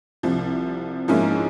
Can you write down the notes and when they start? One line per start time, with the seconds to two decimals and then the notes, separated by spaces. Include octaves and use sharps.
0.23 C2 C3 F3
1.08 G#2 F3 A#3 C#4 E4